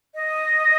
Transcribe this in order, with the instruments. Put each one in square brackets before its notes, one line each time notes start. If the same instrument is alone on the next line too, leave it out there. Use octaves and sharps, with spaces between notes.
[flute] D#5